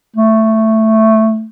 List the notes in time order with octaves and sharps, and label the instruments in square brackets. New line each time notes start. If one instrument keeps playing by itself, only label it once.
[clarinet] A3